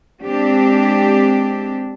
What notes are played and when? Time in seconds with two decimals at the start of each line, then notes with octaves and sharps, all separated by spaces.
0.24 G#3 C4 D4 G4